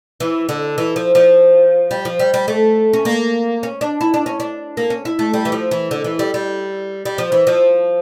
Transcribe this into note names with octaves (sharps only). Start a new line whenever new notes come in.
E3
D3
E3
F3
F3
G3
F3
G3
G3
A3
C#4
A#3
C#4
D4
E4
D4
C#4
D4
A#3
C#4
E4
A3
G3
E3
F3
E3
D3
E3
G3
G3
G3
F3
E3
F3